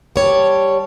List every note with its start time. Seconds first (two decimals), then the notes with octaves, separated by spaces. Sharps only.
0.16 G3 C#5 A5